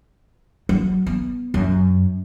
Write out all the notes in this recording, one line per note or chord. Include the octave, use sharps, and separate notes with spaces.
F#3
B3
F#2